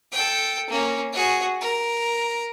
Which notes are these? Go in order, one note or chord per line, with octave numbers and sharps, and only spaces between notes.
A4 G5
A#3 C#4
F#4 G#4
A#4